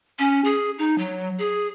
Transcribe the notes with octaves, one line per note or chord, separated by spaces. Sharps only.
C#4
G#4
D#4
F#3
G#4